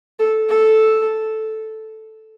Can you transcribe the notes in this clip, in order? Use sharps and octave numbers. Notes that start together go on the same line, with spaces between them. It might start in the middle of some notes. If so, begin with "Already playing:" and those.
A4
A4